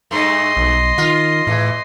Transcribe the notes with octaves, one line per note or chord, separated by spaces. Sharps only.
G2 A3 D#5 C6
B1
D#3 F4
E2 A2 E3